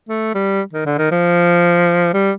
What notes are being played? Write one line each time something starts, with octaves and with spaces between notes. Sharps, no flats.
A3
G3
D#3
D3
D#3
F3
G3